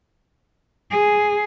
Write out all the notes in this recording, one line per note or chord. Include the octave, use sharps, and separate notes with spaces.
G#4